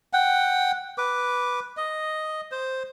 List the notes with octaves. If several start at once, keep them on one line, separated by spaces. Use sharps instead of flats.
F#5 G5
B4 D6
D#5
C5